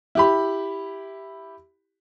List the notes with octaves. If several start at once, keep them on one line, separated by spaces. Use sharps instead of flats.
E4 G4 B5